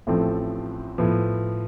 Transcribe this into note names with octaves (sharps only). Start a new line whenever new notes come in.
A1 A2 F3 A3 C4
A2 F3 B3